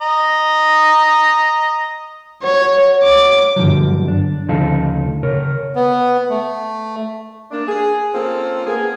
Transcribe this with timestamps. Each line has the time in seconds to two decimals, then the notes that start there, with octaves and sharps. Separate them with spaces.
0.02 D#5 A#5
2.43 F#3 C#5
3.03 D6
3.56 G2 D3 F3 F#3
4.08 D4
4.48 D2 C#3 F3 D#4 A4 F5
5.23 C#3 A#4 C#5
5.75 B3
6.30 A3
7.51 A#3 D4
7.68 G#4
8.13 A#3 C4 C#4 F4 A4
8.67 A#3 B3 G#4